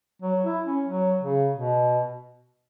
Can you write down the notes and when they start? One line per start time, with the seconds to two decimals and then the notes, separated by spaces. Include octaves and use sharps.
0.22 F#3
0.44 E4
0.66 C#4
0.88 F#3
1.21 C#3
1.54 B2